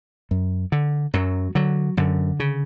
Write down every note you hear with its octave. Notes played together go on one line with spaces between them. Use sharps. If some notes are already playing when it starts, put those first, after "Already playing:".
F#2
D3
F#2 F#3
D3 F#3
F#2 D3
C#3